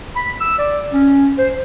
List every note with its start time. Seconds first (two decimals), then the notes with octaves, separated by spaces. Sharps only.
0.16 B5
0.40 E6
0.58 D5
0.93 C#4
1.38 C5